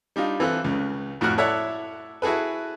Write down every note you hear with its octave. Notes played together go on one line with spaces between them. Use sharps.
G3 D4 D#4 F4
E3 C4 F4 A4 F#6
C#2 C#3
F2 A2 F#4 F#5 F6
E4 A4 C#5 D5 E5 F#5
E4 F#4 G#4 A4 B4